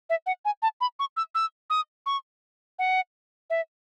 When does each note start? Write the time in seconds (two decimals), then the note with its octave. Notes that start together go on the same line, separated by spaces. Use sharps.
0.10 E5
0.26 F#5
0.45 G#5
0.62 A5
0.81 B5
0.99 C#6
1.17 E6
1.35 E6
1.70 D#6
2.06 C#6
2.79 F#5
3.50 E5